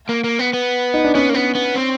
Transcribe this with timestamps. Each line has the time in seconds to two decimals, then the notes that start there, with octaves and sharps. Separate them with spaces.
0.09 A#3
0.24 A#3
0.39 B3
0.53 B3
0.94 D#4
1.04 D4
1.14 B3 C#4
1.29 A#3
1.34 B3
1.55 B3
1.75 C4